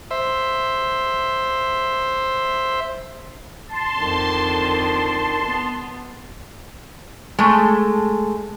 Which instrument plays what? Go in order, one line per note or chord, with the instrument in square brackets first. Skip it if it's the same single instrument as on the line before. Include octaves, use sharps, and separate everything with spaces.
[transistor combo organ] C5 E5
[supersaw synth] A5 C6
[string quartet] F2 D3 D#3
B3
[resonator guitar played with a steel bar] G#3 A3